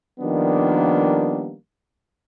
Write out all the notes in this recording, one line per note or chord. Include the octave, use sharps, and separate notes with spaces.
D#3 F3 G3 A#3 B3 D4